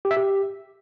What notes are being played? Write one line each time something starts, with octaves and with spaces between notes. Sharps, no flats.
G4
E5
G4